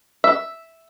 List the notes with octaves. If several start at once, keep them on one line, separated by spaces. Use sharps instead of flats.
E5